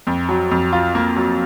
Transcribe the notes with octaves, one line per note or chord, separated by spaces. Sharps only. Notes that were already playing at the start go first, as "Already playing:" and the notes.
F2
F#3
F2
F4
A#3
F#3